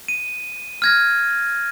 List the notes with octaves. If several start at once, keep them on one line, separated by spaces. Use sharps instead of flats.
D#7
F6 G#6 A#6